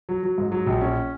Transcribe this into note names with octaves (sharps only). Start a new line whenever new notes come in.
F#3
F#3
G#2
F#3
A#1
C#4